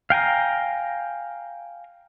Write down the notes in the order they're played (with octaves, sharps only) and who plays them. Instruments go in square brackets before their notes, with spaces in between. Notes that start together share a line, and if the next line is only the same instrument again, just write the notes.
[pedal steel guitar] F5 G5 G#5 A#5